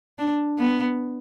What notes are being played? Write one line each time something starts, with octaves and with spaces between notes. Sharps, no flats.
D4
B3